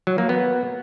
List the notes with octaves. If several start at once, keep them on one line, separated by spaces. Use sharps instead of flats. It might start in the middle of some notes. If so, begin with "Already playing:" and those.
F#3
A#3
B3